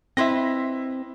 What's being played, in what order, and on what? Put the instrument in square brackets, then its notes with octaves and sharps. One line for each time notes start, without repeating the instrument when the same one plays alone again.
[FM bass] C4 [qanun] E4 B4 D#5 [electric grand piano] E5 C6 A#6